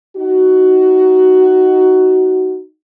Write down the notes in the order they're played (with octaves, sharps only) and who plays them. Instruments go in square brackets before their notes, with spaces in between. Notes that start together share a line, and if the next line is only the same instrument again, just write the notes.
[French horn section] D#4 F#4